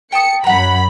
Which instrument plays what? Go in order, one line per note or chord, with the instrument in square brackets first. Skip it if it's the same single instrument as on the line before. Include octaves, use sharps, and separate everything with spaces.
[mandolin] G5 A5 D#6 [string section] C#7
[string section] F#2 B5 [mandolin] F#5 A#5